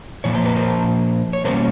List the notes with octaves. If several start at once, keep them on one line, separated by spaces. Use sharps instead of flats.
A#2 F3 A#3 C#5
C5
B4
A#4 C5
C#5
B2 G3 A#3 C#4 A#4 C5